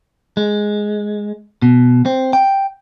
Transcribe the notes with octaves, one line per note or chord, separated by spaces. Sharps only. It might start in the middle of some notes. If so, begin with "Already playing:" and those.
G#3
B2
C4
G5